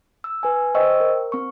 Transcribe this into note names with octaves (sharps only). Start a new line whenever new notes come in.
E6
B4 G#5
C5 D#5 G5 C#6 E6
A#4
C4 C#6